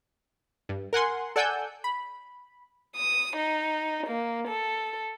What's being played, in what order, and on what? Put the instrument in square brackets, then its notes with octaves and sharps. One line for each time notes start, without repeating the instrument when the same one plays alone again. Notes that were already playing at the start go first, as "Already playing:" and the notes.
[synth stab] G2
A#4 F#5 G#5 C6
A4 D5 F#5 G#5 E6 G6
B5
[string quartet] D#6
D#4
A#3
A4